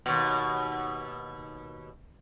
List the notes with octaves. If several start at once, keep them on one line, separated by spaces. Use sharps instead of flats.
D#2 B2